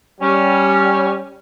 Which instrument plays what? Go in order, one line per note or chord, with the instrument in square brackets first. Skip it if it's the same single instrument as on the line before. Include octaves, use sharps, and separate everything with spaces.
[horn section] G3 C#4